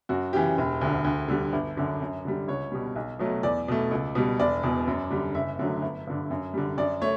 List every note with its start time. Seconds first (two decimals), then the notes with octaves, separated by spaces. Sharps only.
0.09 F#2 F#4
0.33 C#3 E3 G4
0.58 E1
0.81 D2 D3
1.04 D2
1.28 D3 G3
1.53 G1
1.77 F#2 D3
2.01 F#2
2.25 D3 G3
2.48 C#2 C#5
2.72 B2 G3
2.96 B1
3.19 B2 F#3 A3
3.43 E2 D5
3.68 B2 A3
3.91 C#2
4.15 B2 G3
4.39 E1 D5
4.63 E2 B2
4.88 F#2
5.10 D3 G3
5.35 F#1 E5
5.59 F#2 D3 F#3 A3
5.82 G1
6.07 G2 D3
6.31 F#2
6.54 D3 G3
6.77 F#2 D5
7.01 A3 C#5